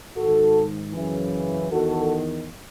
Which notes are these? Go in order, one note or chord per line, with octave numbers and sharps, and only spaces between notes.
G#2 D#3 F#4 A4
F#2 C#3 E3
E2 D#3 F#4 A4